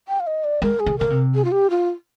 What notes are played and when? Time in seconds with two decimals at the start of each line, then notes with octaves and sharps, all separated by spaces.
0.08 G5
0.20 F5
0.27 D#5
0.44 D5
0.62 G#3 A#4
0.80 G#4
0.86 D3
0.99 D3 A#4
1.10 C3
1.35 G#4
1.44 F4
1.52 G4
1.70 F4